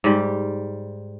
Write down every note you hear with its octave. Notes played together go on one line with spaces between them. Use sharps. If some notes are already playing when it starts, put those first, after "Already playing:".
G#2 G3